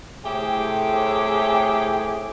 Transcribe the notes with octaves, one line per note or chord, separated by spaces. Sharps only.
A2 C3 A3 G4 G#4 G5